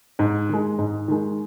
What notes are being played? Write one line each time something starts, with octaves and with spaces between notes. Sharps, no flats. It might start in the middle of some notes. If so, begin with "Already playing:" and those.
G#2
D#3 G#3
G#2
D#3 G#3